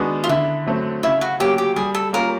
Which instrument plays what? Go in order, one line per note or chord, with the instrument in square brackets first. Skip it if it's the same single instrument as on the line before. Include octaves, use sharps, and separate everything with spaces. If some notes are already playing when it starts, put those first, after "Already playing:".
Already playing: [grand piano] D#3 G#3 B3 D4 F#4
[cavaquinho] F4
[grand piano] D3 [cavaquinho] E4
[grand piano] F#3 A3 C4
[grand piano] C#3 [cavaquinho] E4
[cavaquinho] F#4
[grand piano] F#3 A#3 C#4 [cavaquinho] G4
[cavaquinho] G4
[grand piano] G3 [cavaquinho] G#4
[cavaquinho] A4
[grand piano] A#3 C#4 F4 [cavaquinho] A#4